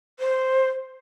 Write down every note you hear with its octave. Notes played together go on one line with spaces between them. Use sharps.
C5